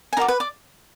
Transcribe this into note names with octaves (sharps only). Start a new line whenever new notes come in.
G#5
D#4 F#4 A#4 D5 A#5
B4 B5
D5 D6